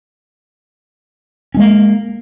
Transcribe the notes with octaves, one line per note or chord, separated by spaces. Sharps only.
G#3 A#3 C#4